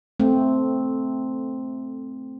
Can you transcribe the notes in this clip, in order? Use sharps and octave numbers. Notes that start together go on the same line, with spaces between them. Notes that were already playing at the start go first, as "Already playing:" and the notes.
A3 C4